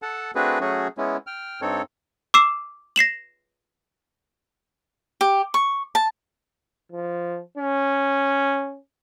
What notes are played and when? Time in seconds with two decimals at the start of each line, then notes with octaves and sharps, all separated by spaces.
0.02 A4 F#5 A5
0.35 A3 C4 D4 F#4 G#4 B4
0.61 F#3 A3 C#4 F#4 G#4
0.98 G#3 B3 C#4 E4
1.27 G5 F6
1.61 G2 C4 D#4 A4 C#5
2.34 D6 E6 C7 E7
2.96 A#6 C7 E7 F#7
5.21 G4
5.54 C#6
5.95 A5
6.92 F3
7.58 C#4